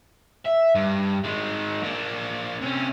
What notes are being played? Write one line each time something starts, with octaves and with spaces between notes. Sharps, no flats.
E5
G2
D#3 G#3
A#3 D4
C3 C#4